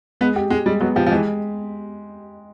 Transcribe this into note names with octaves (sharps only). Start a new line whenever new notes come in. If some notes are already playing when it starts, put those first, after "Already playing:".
G#3 B3
G4
G#3 G4
G3 G#3
F#3 B3
F3 G4
F3
E3 G#3